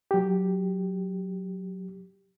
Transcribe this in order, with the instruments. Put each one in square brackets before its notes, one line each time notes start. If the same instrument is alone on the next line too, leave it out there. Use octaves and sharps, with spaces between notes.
[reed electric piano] F#3 G4